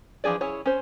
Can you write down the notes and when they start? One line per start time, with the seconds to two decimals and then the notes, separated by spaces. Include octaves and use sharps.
0.24 E3 F3 D4 G#4 D5
0.41 C#4 E4 G#4 C#5
0.66 C#4 C5